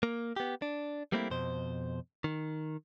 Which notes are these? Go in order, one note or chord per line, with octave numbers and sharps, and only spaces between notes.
A#3
B3 G4
D4
G3 A3 A#3 C4 E4
F2 B2 C5
D#3